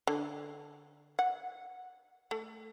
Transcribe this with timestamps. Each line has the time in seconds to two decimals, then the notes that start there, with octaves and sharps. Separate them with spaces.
0.07 D3
1.19 F#5
2.31 A3